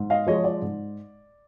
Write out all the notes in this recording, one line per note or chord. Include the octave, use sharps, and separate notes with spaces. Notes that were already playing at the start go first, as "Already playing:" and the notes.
Already playing: G#2
D#5 F5
F3 G#3 C#5 D#5
D5
G#2